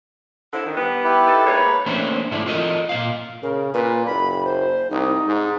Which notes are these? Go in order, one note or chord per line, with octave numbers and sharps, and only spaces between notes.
D3 C4 E4
D#3
G3 B3
E4 G4 B4
D#4 A4
G#2 A#3 B4 C#5
A3 A#3 C#4 D4 C5
G#2 D3 A3 D4 E4
F4 A4 A#4 D#5
A#2 G#3 F5
C#3 A#4
A#2 B4
F#1 B5
C5
C2 D#4
G#2